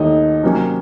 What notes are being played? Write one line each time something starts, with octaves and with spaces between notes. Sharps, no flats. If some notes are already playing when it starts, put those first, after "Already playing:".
Already playing: D#2 D#3 A3 D#4
C3 F#3 A#3 C#4